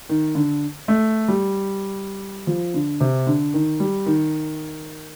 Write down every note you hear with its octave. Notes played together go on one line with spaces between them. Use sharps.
D#3
D3
A3
G3
F3
D3
C3
D3
D#3
G3
D#3